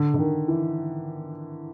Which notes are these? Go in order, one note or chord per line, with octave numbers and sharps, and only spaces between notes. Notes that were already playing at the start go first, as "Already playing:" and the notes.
Already playing: D3
D3
D#3
E3